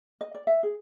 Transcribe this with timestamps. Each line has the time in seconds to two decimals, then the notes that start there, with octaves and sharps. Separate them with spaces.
0.21 D#5
0.35 D5
0.47 E5
0.63 G#4